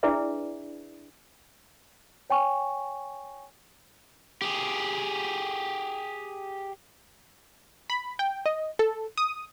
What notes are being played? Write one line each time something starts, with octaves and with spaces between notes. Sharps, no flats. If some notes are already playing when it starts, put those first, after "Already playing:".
D4 E4 G#4 B4 D5 E5
C#5 G5 G#5 C#6
G4 G#4
B5
G5
D#5
A4
D#6